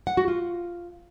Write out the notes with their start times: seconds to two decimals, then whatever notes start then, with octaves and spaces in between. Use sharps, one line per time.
0.07 F#5
0.17 F#4
0.28 F4